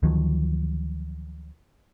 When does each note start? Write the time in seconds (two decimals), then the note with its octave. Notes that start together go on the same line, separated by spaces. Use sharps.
0.03 D2 D#3 F3 F#3